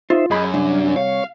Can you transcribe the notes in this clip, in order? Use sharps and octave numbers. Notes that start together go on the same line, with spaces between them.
D#4 F4 C5 E5
F#2 G#4 D#5 B5
C2 D4
C#5 F5